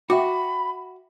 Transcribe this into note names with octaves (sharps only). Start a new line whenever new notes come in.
F#4 E5 G5 B5 D6